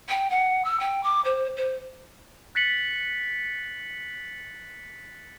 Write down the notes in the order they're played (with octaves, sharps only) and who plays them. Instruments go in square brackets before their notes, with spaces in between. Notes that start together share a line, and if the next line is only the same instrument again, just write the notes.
[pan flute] G5
F#5
E6
G5
D6
C5
C5
[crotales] F#6 A6 B6 C#7 F#7